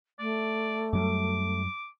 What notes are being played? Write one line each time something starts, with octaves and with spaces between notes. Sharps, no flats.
A3 D5
F#2 F#3 G3 D6